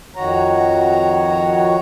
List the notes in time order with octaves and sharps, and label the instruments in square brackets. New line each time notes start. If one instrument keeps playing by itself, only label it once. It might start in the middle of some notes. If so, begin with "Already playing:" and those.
[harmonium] F2 D#3 F#4 C#5 A#5